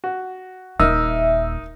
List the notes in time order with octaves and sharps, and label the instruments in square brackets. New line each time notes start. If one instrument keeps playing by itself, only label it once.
[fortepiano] F#4
[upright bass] D#1 [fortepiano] D#4 A#4 [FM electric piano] E5